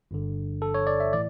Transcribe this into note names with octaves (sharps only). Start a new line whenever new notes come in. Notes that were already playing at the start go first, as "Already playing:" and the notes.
G1 G2 D3
A4
C#5
D5
E5
A2 E3 D5